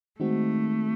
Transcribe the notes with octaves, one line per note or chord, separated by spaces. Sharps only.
D#3 G#3 A3 C4 D#4 F#4